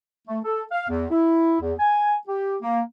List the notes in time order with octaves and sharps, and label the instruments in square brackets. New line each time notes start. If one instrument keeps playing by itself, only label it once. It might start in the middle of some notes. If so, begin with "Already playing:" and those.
[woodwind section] A3
A4
F5
E2
E4
E2
G#5
G4
A#3